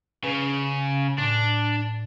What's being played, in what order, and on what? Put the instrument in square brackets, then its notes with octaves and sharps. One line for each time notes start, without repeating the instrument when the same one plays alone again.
[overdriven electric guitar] C#3 [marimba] B4
[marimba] A2 [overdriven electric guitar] D4